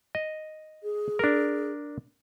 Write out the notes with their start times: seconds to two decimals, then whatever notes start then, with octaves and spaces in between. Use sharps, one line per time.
0.15 D#5
0.83 G#4
1.19 D4 A#4